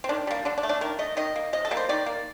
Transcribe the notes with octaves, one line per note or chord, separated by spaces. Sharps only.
C4
D#3 D4
G3 A#3
D3 D4
D4
A3
D4
D#3 A#4
A3 D#5
D#3 D#5
A#3
C3 D#5
A4
G3 A#3
C5
D#3 D5
A#3